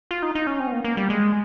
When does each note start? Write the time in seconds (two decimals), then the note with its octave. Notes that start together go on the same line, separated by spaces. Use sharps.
0.11 F4
0.23 D#4
0.35 D#4
0.47 C#4
0.60 C4
0.67 B3
0.73 A#3
0.84 A#3
0.97 G3
1.10 G#3